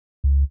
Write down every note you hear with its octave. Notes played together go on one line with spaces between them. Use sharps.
C#2